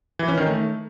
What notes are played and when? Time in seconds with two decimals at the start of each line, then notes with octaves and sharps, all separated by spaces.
0.19 E3
0.28 C#4
0.37 D#3
0.47 A3